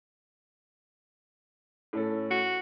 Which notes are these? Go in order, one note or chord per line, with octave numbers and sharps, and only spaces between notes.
A2 C#4 A4
F#4